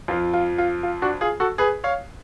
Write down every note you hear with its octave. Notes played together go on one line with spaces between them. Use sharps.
F2 F3 F4
F4
F4
F4
D4 F#4
F4 G#4
F#4 A4
G#4 B4
C#5 F5